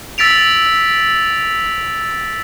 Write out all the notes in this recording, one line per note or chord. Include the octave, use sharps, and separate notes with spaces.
E6 A6 B6 D7 F7